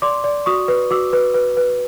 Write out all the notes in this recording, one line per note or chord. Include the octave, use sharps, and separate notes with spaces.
D5 C6 D6
D5
F#4 C#6 D#6
B4
F#4 D6 E6
B4
B4
B4